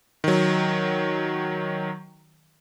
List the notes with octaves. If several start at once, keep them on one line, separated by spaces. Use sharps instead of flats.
D#3 F#3